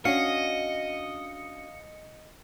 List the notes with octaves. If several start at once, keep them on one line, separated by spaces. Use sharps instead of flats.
C#4 D4 F#4 D#5 F5 C#7